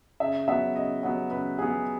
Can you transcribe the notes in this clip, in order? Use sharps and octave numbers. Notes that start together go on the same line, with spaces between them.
C#3 E5
F#3 B3 E5
C#3 D#5
F#3 B3
C#3 B4
F#3 B3 G#4